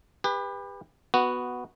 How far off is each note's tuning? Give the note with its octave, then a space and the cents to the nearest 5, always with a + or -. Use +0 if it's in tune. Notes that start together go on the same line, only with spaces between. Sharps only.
G4 +35 B4 +0
B3 +0 F#4 +0